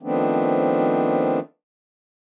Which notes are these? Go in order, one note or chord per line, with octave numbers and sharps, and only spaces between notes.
D#3 F3 A3 B3 C4 D4